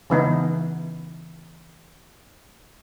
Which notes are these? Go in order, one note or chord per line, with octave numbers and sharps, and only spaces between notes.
C#3 E3 B3 D#4